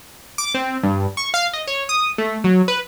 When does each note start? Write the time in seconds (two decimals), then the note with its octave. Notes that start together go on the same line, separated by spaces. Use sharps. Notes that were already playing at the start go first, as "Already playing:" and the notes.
0.38 D6
0.55 C4
0.83 G2
1.17 C#6
1.34 F5
1.53 D#5
1.67 C#5
1.89 D#6
2.18 A3
2.44 F#3
2.68 B4